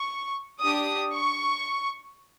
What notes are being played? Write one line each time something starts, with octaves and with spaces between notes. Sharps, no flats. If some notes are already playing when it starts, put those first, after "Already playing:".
Already playing: C#6
D4 G4 D#6
C#6